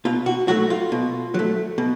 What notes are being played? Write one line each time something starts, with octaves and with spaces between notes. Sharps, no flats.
B2 F4
F#4
F#3 A3 F#4
F4
B2
F#3 A3
B2